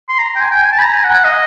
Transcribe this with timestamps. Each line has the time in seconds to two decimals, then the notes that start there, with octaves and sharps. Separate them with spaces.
0.09 C6
0.19 A#5
0.36 G5
0.40 G#5
0.51 G5
0.61 G#5
0.72 A5
0.79 B5
0.83 A#5
0.93 G#5
1.04 F#5
1.14 F#5
1.24 D#5